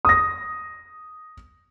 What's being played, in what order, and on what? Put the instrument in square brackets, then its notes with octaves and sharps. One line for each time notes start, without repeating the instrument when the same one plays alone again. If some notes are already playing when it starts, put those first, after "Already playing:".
[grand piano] D#6 A#6